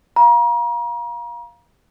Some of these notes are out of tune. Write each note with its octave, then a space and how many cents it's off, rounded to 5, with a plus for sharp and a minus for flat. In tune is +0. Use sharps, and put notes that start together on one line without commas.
F5 +0 A#5 +35